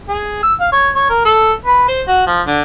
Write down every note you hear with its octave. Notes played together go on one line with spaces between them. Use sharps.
G#4
E6
F5
C#5
C#5
A#4
A4
B4
C5
F#4
F3
D3